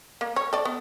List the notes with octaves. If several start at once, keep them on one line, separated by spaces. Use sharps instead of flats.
A#3
C#5
A4 D5
B3